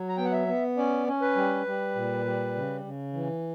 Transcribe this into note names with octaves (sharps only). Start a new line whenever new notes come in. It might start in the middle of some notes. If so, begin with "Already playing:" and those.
Already playing: F#3
A#5
B3 G5
F#5
E5
B3
C#4 D5
C#4
B4
G3
G3
A#2
G3
C#3
C#3
E3